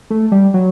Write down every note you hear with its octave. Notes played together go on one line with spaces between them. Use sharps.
A3
G3
F#3